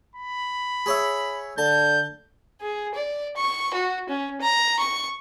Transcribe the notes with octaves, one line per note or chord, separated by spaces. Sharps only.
B5
G#4 C#5 E5
D3 A5 G6
G#4
D5
C#6
F#4
C#4
A#5
C#6